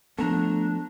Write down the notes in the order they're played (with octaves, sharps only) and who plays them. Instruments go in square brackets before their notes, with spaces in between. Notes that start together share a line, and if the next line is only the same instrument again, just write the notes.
[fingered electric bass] F3 B3 [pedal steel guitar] A3 A#5 [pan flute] D4